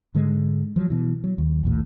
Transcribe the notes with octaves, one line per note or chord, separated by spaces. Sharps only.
G#2 D3 G#3
F3 F#3
B2 E3
F#3
D#2
A#1 D#2 A2